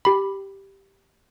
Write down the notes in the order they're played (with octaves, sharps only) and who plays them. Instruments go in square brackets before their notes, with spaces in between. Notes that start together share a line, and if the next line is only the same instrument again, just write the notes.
[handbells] G4 B5